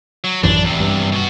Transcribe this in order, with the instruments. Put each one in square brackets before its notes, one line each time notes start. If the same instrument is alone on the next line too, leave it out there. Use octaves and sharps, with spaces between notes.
[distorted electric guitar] F#3
[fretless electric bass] A1 F#2 E3 [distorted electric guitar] D4
[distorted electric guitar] E2 C3
[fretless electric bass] G2
[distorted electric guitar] B2 F#4